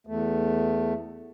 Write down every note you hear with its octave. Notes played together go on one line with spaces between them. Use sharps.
E2 A3